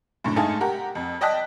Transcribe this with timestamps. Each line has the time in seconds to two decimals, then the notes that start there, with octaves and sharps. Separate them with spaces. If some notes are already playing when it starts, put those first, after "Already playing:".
0.24 F#2 A2 D3
0.36 G#2 A3 D#4 F5 G#5 A5
0.61 G4 A#4 F#5
0.95 F2
1.21 D5 D#5 G5 A5 F#6 B6